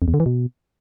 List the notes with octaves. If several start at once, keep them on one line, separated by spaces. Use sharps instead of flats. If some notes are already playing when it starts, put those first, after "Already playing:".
F2
E2
D3
E3
B2